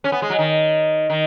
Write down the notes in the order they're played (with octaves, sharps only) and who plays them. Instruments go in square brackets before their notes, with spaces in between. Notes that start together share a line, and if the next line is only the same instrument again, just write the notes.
[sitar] C#4
B3
G#3
F#3
D#3
D#3